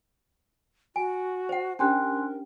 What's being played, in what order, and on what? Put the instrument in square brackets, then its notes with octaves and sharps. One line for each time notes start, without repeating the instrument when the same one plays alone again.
[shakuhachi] F#4 [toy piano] G#5
[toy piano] C5 F#5
[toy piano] C#4 D4 G4 [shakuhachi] A#4 [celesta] G#5 C6 F#6